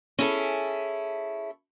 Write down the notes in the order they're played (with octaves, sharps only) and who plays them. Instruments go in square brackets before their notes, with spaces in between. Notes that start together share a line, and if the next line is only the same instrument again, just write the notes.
[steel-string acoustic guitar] C#4 E4 G#4 A4